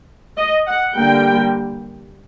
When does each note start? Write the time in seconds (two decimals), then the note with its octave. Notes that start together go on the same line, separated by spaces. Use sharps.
0.37 D#5
0.67 F#5
0.95 D3 G3 A#3 G5